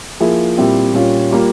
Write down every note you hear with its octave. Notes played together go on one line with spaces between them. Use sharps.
F3 A#3 E4 G#4
A#2 G3 C4 E4
A#2 G3 C#4 F4
G3 A#3 F4 A#4